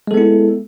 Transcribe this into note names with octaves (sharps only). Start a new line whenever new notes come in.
G#3 B3 E4 A4